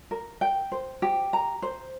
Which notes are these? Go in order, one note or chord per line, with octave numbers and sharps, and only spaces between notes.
A#4
G5
C5
G4
A#5
C5